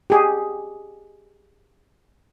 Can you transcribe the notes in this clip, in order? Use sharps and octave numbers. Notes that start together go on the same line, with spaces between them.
G4 G#4